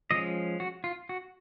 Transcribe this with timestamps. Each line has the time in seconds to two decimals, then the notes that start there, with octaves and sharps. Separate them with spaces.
0.11 F3 G#3 C#4 D#5
0.60 F#4
0.84 F4
1.09 F#4